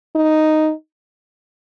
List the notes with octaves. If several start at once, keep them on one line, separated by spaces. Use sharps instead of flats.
D#4